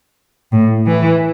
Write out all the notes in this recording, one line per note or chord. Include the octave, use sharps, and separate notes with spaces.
A2
E3